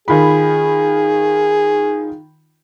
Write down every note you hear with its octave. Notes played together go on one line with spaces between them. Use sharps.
D#3 F4 G#4 B5